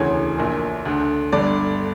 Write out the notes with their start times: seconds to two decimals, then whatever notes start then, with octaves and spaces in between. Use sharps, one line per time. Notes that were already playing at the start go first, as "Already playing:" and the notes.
Already playing: E1 D2 C#3 E3 C#5
0.38 A#1 A#2
0.85 D2 D3
1.32 G1 G2 D3 D5